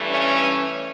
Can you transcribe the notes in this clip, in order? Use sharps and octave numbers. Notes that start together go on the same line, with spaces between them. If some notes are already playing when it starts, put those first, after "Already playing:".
Already playing: G2 E3 A3
C#4